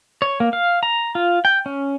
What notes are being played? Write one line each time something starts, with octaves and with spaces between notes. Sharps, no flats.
C#5
A#3
F5
A#5
F4
G5
C#4